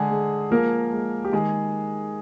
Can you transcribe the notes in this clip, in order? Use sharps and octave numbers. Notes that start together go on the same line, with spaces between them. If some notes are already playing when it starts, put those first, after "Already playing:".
Already playing: D3 G#3 G#4
G#3
F3 A#3 A#4
G#3
G4
D#3 G#3 G#4